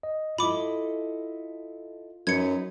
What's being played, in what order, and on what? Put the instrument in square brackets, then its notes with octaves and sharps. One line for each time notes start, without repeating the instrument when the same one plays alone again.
[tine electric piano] D#5
[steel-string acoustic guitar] E4 A4 D#5 [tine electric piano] F4 [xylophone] B5 D6
[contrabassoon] F#2 [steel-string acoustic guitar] D#4 B4 [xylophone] G#6 C#7